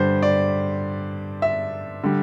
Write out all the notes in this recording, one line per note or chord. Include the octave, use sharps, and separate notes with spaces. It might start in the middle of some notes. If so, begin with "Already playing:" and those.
Already playing: G2 D3 G3 C5
D5
E5
D3 G3